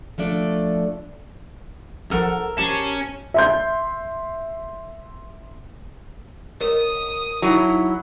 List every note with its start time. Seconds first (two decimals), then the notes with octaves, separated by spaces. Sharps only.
0.18 F3 A3 D4 D5
2.11 A#1 F3 A4 A#4 F#5
2.58 A#1 C#4 G4 A5 C7
3.34 E5 C6 G6
6.60 A#4 C#5 D#5 D#6
7.42 F#3 D#4 E4